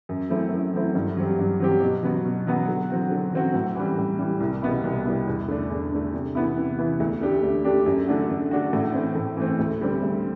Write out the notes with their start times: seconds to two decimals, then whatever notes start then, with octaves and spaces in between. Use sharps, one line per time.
0.09 F#2
0.30 F#3 A3 C4 E4
0.52 F#2
0.74 F#3 A3 C4 E4
0.95 G2
1.17 F#3 C4 G4
1.39 G2
1.60 F#3 C4 G4
1.81 B2
2.03 F#3 B3 F#4
2.24 B2
2.47 F#3 B3 F#4
2.68 D3
2.90 F#3 C4 F#4
3.11 D3
3.33 F#3 C4 F#4
3.54 A2
3.76 E3 G3
3.98 A2
4.19 E3 G3
4.40 C2
4.62 B2 G3 B3 E4
4.84 C2
5.06 B2 G3 B3 E4
5.27 E2
5.48 D3 A3 D4
5.70 E2
5.92 D3 A3 D4
6.13 C3
6.35 E3 B3 E4
6.57 C3
6.79 E3 B3 E4
7.00 D2
7.21 D3 A3 D4 G4
7.43 D2
7.64 D3 A3 D4 G4
7.86 F#2
8.07 D3 A3 D4 F#4
8.30 F#2
8.51 D3 A3 D4 F#4
8.73 A2
8.94 E3 A3 C4
9.16 A2
9.37 E3 A3 C4
9.59 D2
9.81 D3 G3 C4
10.03 D2